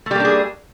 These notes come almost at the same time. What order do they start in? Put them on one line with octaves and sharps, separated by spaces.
A3 G3 A#3 D4 G#4